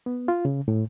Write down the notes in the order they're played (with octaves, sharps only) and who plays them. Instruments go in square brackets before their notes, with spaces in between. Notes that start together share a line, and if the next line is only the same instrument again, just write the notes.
[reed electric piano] B3
F4
C#3
A2